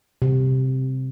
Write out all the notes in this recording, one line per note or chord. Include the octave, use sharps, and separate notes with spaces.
C3